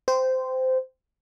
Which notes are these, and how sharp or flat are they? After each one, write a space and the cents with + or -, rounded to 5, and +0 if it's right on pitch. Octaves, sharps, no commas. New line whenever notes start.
C5 -15 G5 +0